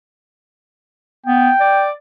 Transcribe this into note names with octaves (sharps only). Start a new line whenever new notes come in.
B3 G5
D5